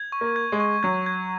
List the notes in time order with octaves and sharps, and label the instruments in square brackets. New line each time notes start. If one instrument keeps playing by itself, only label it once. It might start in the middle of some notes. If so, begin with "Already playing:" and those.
Already playing: [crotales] G#6
C#6
[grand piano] A#3
[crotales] G#6
[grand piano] G#3
[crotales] C#6
[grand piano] F#3 [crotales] G#6
[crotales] G#6